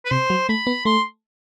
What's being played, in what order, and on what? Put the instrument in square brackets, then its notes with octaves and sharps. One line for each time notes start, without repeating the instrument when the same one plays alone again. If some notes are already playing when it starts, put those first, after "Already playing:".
[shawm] B4
[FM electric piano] C3 [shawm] C5
[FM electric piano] F#3
[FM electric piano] A3 [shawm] B5
[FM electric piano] B3
[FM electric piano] A3 [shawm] C6